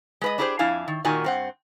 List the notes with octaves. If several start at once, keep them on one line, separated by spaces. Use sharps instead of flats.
G#3 B4 D#5
D4 E4 G4 G#4 A#4 C5
F2 D4 E4 F5 G#5
D#3
A#2 D#3 F#4 A#4 G#5
G2 C4 F#5